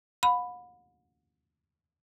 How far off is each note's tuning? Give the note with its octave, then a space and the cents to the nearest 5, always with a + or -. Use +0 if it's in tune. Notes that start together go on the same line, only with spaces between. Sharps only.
F#5 -45 B5 +5